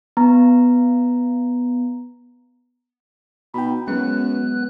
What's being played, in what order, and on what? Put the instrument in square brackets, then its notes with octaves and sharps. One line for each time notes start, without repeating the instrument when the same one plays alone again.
[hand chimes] B3 A#5
[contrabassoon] B2 [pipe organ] D#4 [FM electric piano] G5 B5
[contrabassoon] F#2 [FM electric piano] G#3 [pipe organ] B3 B4 F#6